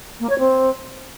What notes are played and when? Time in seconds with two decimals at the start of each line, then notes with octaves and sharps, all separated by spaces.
0.20 A#3
0.29 C#5
0.39 C4